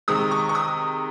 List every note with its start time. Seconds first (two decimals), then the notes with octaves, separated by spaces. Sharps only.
0.08 C3 D#3 G#3 D#6
0.31 C#6
0.49 C#6
0.55 D#6